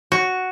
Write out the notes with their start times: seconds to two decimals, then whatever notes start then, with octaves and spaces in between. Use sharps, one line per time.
0.12 F#4